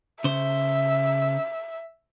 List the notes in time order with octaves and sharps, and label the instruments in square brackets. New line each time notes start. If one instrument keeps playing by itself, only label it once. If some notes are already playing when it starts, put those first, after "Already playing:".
[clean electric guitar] C#3 C5 [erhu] E5